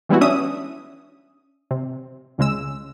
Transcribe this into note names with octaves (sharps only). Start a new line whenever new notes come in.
E3 G3 G#3 B3 E4 F#4
C#4 D4 E5 D#6
C3
C#2 C#3 G#3 E6